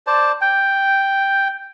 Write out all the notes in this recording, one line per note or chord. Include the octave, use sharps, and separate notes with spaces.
C5 D5 A5
G5